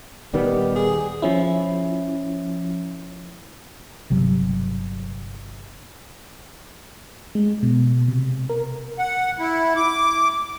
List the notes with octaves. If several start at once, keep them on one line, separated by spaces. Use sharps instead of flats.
D#1 D#3 G3 B3
G#4
F3 C#4 E4
G1 C3 F#3
G#3
B2
C3
A#4
F#5
E4
D6